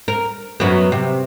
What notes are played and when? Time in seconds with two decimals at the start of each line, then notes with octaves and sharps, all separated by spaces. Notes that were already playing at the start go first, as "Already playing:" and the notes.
0.08 A#4
0.60 F#2 F#3 B3
0.92 C3